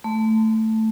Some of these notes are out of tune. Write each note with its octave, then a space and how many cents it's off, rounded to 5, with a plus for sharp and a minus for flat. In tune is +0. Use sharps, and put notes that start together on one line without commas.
A3 +5